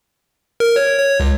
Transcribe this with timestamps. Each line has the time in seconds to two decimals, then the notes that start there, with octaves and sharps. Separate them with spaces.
0.60 A#4
0.76 C#5
0.98 C#5
1.20 C#2